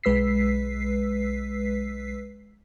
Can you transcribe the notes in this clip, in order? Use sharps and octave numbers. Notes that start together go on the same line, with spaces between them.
B1 G#3 B4 E6 B6 C7